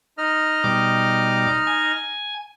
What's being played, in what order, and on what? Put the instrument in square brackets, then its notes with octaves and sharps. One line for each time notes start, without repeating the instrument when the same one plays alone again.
[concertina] D#4 D#5 F6
[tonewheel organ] B2 G3 D6
G#5